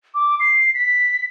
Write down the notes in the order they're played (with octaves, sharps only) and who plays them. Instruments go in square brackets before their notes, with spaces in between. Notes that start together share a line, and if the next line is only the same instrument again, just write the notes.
[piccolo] D6
C7
B6